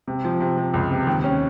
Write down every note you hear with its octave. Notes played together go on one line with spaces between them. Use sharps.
C3
F3
C3
C3
C#2
C3
D#2
C#4